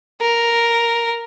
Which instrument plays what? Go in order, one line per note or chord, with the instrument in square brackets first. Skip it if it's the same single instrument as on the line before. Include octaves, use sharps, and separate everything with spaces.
[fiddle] A#4